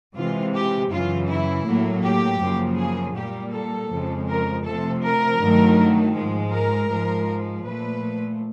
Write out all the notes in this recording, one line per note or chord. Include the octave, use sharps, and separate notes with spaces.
C3 E3 G#3 F4
G4
F#2 C#3 E3 F4
E4
A2 F#3 A#3
G4
F#2 C#3 F3 A#3
G#4
A#2 G3 A#3 G4
A4
F2 C#3 F3 G#3
A#4
C3 F3 A3 A4
A#4
G2 D#3 F#3 A3
G#2 F3 G#3
A#4
G#2 F3 G#3
A#2 F3 A3 B4